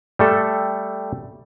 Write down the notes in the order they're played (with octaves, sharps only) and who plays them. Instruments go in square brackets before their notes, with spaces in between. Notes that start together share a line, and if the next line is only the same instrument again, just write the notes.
[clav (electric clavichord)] G3 A3 A4